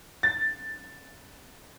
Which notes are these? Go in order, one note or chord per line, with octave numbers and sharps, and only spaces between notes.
A6